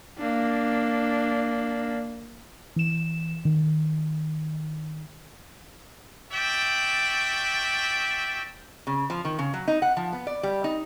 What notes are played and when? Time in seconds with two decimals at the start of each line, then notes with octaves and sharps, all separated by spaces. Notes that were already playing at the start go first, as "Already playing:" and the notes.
0.18 A#3 D4
2.76 E3 E7
3.45 D#3
6.33 F#4 D5 E5 G5
8.87 C#3
9.10 F3
9.25 D#3
9.39 C#3
9.54 F#3
9.68 D#4
9.82 F#5
9.97 F3
10.13 B3
10.27 D5
10.43 G3
10.64 D#4